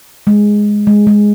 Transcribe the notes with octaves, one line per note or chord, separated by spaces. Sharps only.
G#3
G#3
G#3